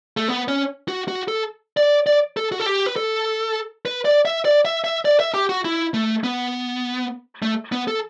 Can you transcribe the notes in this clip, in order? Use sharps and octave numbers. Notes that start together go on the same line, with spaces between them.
A3
B3
C#4
F#4
F#4
A4
D5
D5
A4
F#4
A4
G4
B4
A4
B4
D5
E5
D5
E5
E5
D5
E5
G4
F#4
E4
A3
B3
A3
B3
A4